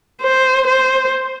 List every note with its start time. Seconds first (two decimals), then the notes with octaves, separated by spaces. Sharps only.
0.22 C5
0.68 C5